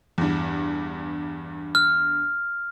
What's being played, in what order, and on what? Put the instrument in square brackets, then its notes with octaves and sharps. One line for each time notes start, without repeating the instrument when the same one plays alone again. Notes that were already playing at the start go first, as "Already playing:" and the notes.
[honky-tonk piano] E2 G2
[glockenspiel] F6